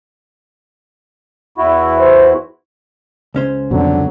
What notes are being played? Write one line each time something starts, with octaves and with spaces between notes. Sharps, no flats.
E2 E4 F#4
C5
C#2 C#4 C5
F2 B2 D3 F#3